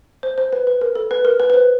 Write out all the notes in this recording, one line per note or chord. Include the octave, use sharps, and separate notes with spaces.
C5
C5
B4
B4
A#4
A4
B4
A#4
B4
B4
C5